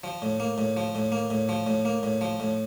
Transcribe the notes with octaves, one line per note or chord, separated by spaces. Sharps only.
F3
A2
A#3
A2
F3
A2
A#3
A2
F3
A2
A#3
A2
F3
A2